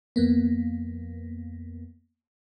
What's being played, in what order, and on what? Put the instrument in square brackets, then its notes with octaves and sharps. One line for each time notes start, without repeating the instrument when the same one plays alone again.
[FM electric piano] F2 A#3 B3